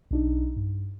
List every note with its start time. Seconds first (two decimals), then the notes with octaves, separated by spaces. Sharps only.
0.11 B1 D4 D#4
0.56 G2